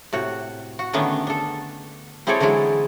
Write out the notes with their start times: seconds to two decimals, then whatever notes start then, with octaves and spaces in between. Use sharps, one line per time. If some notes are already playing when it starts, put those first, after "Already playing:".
0.13 A2 C3 F#4
0.79 F#4
0.93 D3 D#3 A3 B3 C#4 D4
1.27 D4 A4
2.27 C4 E4 G#4 A4 C#5 D5
2.40 D3 E3 F#3 G#3 E4